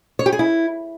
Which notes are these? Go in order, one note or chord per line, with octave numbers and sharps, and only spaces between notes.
C#5
G4
G#4
E4